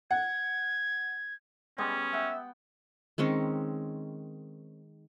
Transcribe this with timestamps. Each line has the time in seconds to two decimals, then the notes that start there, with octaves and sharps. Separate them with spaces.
0.11 F#5 G#6
1.78 G3 G#3 B3 C#4
2.13 E5 F#5 G5
3.18 D#3 G#3 C4 C#4